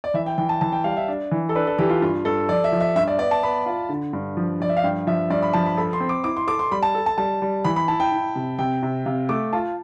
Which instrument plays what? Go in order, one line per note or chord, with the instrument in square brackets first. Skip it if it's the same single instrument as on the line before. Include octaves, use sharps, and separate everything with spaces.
[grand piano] D5
[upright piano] E3 [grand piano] E5
[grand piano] G5
[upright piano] E3 [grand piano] G5
[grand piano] A5
[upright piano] E3 [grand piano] A5
[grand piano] G5
[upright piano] G3 [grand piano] F5
[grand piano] E5
[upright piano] D4
E3
[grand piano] A4
[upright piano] D4 [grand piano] B4
[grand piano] A4
[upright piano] E3 [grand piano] G4
[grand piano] F4
[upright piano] G2 [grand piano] F4
[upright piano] G2 [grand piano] A4
[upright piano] F3 [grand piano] D5
[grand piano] E5
[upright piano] F3
[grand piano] E5
[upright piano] G2 [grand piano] E5
[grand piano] D5
[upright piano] B3 [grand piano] D5
[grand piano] A5
[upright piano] B3 [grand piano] B5
[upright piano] F4
D3
G2
F3
[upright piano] F3 [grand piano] D5
[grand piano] E5
F5
[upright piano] G2 [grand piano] G5
[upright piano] F3 [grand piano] E5
[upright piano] G2 [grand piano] D5
[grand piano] B5
[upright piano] F3 [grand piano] A5
[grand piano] B5
[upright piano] A4 [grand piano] B5
[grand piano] C6
[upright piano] C4
[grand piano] D6
[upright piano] E4 [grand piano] D6
[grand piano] C6
[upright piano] A4 [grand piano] D6
[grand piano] C6
[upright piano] G3 [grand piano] B5
[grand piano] A5
[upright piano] A4
[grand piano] A5
[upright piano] G3 [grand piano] A5
[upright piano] G3
[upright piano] E3 [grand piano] B5
[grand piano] B5
[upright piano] E4 [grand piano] A5
[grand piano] G5
[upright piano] E4
C3
[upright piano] C3 [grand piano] G5
[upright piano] C3
[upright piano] C3 [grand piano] F5
[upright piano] A3 [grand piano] D6
[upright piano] F4 [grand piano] A5